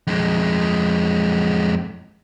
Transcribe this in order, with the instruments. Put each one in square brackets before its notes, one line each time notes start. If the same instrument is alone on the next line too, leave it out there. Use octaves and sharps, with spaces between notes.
[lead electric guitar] F2 G#3